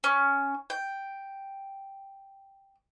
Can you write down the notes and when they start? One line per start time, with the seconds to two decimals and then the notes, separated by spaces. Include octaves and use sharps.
0.04 C#4
0.70 G5